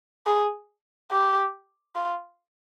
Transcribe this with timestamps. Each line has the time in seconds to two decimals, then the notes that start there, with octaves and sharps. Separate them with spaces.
0.26 G#4
1.11 G4
1.96 F4